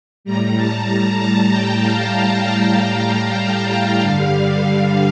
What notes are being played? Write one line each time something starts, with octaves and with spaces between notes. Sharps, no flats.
A2 G3 A#5
A5
A#5
A5
G5
F5
G5
G5
A5
A5
G5
G2 D3 G3 F5